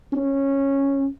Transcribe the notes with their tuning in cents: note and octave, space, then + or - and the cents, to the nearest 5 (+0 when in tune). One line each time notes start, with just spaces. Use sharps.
C#4 -10